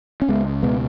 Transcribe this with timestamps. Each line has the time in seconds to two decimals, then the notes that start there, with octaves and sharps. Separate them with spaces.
0.22 C#4
0.28 C#2 G#3 B3
0.63 B2 G#3 B3